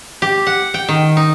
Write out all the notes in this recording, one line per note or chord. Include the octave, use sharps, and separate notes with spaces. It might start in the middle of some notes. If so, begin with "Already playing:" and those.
G4
F#5
G5
D#3
D#4